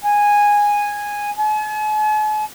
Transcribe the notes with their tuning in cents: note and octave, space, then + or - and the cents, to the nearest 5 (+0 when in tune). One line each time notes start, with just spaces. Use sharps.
G#5 -10
G#5 +45